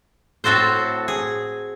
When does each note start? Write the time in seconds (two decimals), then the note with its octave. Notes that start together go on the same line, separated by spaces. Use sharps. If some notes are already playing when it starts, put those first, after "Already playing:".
0.44 A2 C4 F#4 A4 C5
1.08 G#4